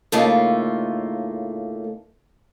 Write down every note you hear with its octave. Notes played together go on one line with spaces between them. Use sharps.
A2 C#3 A3 A#3 D#4 F4